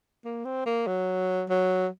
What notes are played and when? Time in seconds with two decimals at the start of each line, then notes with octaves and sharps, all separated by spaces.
0.25 A#3
0.45 C4
0.66 A#3
0.87 F#3
1.50 F#3